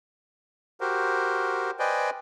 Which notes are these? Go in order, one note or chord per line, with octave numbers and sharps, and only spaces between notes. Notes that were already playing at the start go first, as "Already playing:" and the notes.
F#4 G4 A#4 C5
B4 C5 D5 D#5 G5 G#5